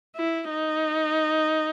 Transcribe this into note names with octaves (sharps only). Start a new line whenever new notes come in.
E4
D#4